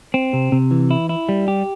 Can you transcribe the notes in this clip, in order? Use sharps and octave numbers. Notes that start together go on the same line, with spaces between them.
C4
C3
C3
E3
E4
E4
G3
G4